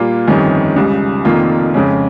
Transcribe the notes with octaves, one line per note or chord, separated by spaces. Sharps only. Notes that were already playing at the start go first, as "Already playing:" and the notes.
Already playing: A#2 G3 A#3 F4
G1 F2 D#3 G3 C#4
C#2 C#3 G3
F1 F2 D#3 A#3 F4
F2 C#3 G#3 C#4